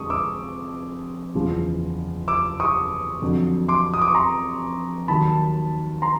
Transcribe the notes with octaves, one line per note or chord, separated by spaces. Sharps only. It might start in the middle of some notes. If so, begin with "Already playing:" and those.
Already playing: F2 D3 F3 G#3 C#6 D#6
D6 E6
F#1 E2 C#3 F3
D6 E6
C#6 D#6
F2 D3 F#3
C6 D6
D#6
D6
C#6
A#5 C6
D#2 D#3 F#3 A5 B5
A#5 C6